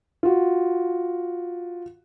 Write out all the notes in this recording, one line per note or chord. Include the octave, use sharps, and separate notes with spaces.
F4 F#4